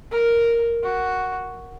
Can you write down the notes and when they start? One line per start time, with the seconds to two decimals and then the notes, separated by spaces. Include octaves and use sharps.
0.11 A#4
0.83 F#4